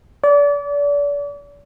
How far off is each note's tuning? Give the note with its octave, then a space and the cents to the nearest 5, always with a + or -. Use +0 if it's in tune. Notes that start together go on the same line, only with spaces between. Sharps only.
D5 -35